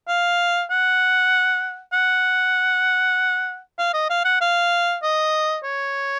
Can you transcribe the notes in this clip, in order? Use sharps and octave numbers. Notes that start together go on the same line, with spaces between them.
F5
F#5
F#5
F5
D#5
F5
F#5
F5
D#5
C#5